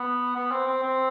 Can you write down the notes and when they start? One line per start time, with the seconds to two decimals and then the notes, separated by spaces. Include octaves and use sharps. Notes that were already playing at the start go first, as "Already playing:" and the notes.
Already playing: B3
0.36 B3
0.52 C4
0.67 C4
0.83 C4